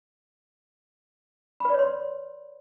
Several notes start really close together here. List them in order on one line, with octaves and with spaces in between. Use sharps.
B5 B4 D5 C#5 C6